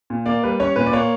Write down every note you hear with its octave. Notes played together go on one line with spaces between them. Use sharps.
A#2
A#3 D5
G3 B4
C#4 C#5
A#2 B4
D5
A#3 C#5